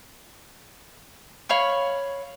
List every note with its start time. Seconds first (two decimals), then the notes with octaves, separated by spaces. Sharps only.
1.49 C#5 F5 B5 C#6